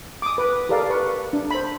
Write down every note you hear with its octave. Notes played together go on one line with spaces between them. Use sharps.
D6 D#6
B4
G4 A4 A#4 D5 F5
B4 C#6
D4
C5 B5